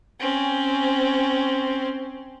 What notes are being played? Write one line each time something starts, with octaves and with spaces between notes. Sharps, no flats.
C4 C#4